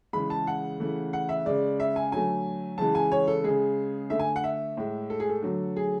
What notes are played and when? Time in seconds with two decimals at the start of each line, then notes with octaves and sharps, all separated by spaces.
0.13 C#3 E3 G#3 B5
0.30 A5
0.47 F#5
0.80 C#3 E3 A3
1.13 F#5
1.29 E5
1.46 C#3 G#3 D5
1.80 E5
1.96 G#5
2.12 D3 F#3 A3 G#5
2.78 C#3 E3 G#3 A5
2.95 G#5
3.12 C#5
3.28 A4
3.44 C#3 G#3 G#4
4.10 D3 A3 E5
4.19 G#5
4.36 F#5
4.44 E5
4.77 A2 G#3
5.10 A4
5.20 G#4
5.29 A4
5.42 D3 F#3 A3
5.77 G#4